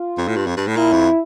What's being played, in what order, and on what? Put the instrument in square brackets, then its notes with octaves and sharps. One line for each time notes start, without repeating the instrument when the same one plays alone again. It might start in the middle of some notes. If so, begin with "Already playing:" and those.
Already playing: [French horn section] F4
[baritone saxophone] F2
A2
G2
F2
G2
A2
[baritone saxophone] A#2 [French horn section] E4
[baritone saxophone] F2